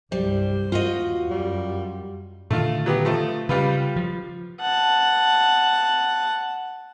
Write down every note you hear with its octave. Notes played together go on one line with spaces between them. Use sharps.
C2 G2 G3 C5
D#2 F4 F#4 D#5
F#2 G3
A#2 D3 D#3 A3 F4
F#3 B3 G4
F3 A3
C#3 G3 F4 B4
F3
F#5 A5